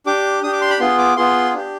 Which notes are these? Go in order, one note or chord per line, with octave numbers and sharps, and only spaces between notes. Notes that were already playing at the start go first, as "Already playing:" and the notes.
D4 G4 D6
D4 G4 D#6
D6
C6
B5
B3 F4 G#4 C6
D6
B3 F4 G#4 C6
D4 G4